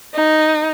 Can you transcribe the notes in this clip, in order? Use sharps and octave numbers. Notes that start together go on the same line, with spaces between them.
D#4